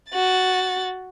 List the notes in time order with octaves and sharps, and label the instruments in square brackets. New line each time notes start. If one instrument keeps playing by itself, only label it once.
[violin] F#4 A6